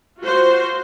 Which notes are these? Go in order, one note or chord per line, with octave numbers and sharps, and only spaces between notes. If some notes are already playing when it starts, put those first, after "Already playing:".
F4 F#4 C5